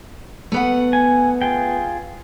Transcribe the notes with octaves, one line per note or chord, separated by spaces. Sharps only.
A3 B3 F#5
G#5
F4 G#4 G5